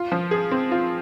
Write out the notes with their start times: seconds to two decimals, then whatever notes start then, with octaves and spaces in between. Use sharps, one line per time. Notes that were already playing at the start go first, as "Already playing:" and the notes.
Already playing: F4
0.12 F3
0.31 G#4
0.51 C4
0.71 F4